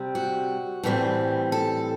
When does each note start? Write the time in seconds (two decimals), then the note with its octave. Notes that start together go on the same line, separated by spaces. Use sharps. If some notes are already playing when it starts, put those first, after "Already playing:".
Already playing: C3 G3 C4
0.15 F#4
0.83 A2 E3 G3 C4
1.52 A4